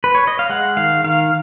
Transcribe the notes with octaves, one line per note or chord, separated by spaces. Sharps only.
B4
C#5
D#5
F5
G#3 F#5
D#3 F5
D#3 F5